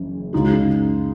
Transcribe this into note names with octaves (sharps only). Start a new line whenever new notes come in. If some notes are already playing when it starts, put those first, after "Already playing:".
Already playing: F#1 F#2 E3
C#2 C#3 G#3 D#4 F#4